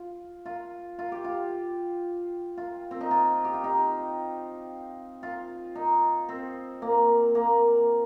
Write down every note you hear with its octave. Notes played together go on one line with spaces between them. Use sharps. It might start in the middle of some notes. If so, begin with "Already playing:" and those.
Already playing: F4
F4
F4
G4
F4
F4
C4
D#4
F4
G4
F4
D#4
F4
D#4
C4
A#3
A#3